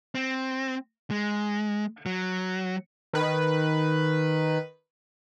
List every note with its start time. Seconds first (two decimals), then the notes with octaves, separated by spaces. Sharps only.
0.15 C4
1.11 G#3
2.06 F#3
3.13 D#3 B4